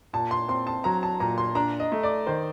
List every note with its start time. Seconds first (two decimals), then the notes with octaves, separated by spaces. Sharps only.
0.13 A#2 A5
0.31 C6
0.48 C4 C6
0.67 A5
0.84 F#3 A#5
1.03 A5
1.20 A#2 A#5
1.38 C6
1.55 D4 A#5
1.80 D#5
1.92 A3
2.03 D5
2.26 D#3 C5